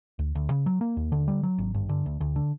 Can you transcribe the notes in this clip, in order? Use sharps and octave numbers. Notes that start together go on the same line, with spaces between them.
D2
D2
C#3
F#3
A#3
D#2
D3
G3
F#3
G#1
G2
D3
D2
D2
D3